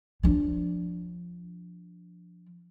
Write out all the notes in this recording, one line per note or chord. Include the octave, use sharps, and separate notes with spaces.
F3 D4